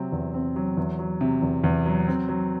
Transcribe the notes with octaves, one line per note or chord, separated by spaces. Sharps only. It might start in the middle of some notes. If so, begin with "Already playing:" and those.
Already playing: C3 F#3 C4
E2
C4
F#3
E2
F#3
C3
E2
E2
F#3
C4
F#3